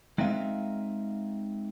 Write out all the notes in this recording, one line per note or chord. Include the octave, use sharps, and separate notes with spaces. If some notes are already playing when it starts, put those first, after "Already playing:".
G#3 C4 D#4 E5 F5